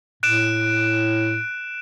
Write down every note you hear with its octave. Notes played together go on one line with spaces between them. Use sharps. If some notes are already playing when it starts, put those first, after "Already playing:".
A2 F#6 D7 E7